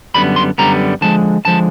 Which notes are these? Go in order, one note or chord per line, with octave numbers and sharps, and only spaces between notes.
F#2 D3 G3 B3 B5
C6
F#2 D3 G3 B3 A#5
D3 F3 G#3 A5
D3 F3 G#3 A5